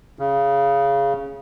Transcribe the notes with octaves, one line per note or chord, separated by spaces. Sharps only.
C#3